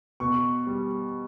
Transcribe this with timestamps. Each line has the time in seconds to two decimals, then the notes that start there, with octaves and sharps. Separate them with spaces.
0.20 B2 C#6
0.67 G3